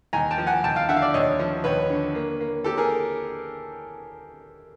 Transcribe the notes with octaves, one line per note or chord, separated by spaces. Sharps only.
D#2 G#5 A#5
G5 A5
F3
F#5 G#5
D#2 G5 A5
F5 G5
D3 E5 F#5
F5
D5 E5
D#2 C#5 D#5
F3
D#2 B4 C#5
D3
A#3
A#3
A#3 G4 A4
G#4 A#4